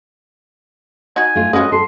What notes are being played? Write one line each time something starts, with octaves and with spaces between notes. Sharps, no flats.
D#4 F#4 G#5
A3 F4
G#3 C#4 F4 F#4 B4 D#5
A4 C6